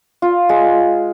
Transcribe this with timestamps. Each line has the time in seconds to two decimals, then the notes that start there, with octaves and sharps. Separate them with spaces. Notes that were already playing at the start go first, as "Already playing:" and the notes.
0.22 F4
0.49 G#3